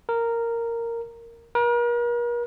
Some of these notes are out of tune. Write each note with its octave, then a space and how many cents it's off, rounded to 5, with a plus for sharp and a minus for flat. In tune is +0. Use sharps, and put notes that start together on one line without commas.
A#4 -10
A#4 +40